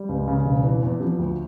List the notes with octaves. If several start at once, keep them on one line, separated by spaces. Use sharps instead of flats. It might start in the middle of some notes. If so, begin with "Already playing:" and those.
Already playing: G3
C#2
C#3
E1
E3
E2
F3
D2